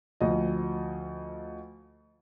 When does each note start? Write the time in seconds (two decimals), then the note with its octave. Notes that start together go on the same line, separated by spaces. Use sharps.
0.21 D2 F3 D#5